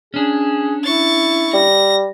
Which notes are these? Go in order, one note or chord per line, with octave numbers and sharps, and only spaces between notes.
C#4 D4 G#4
E4 C#6 A6
G3 A#6